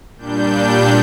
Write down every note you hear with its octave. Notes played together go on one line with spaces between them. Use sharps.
A#2 G3 D4 G6